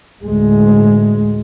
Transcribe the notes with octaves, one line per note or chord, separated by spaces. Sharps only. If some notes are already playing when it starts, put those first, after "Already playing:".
D2 A2 G#3